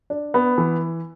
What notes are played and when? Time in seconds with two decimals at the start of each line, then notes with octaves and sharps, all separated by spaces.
0.10 D4
0.34 B3
0.58 E3